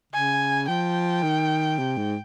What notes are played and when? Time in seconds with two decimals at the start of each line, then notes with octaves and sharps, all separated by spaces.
0.13 C#3 G#5
0.68 F3 G5
1.23 D#3
1.79 C3
1.97 G#2